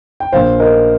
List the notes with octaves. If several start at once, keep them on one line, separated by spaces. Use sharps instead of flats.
G5
A#1 A#2 F3 C5 F5
A#4 D#5